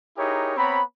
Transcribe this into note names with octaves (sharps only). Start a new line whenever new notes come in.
D#4 E4 G4 G#4 A#4 C#5
B3 C4 C#5 A#5 B5